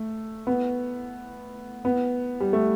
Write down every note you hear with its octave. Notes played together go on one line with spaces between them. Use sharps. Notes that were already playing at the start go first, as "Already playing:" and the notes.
Already playing: A3
B3
B3
G3
A3